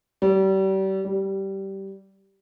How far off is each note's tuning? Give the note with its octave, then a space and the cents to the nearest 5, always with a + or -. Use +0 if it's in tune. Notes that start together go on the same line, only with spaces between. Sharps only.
G3 -35
G3 -15